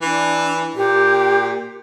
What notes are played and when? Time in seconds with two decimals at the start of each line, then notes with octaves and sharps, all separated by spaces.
0.02 E3 D4
0.76 A#2 G4